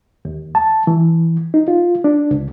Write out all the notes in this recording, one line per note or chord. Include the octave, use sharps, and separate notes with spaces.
D#2
A5
E3
D#4
F4
D4
C#2